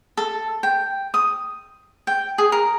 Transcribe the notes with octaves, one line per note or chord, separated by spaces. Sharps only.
A4
G5
D#6
G5
G#4
A#4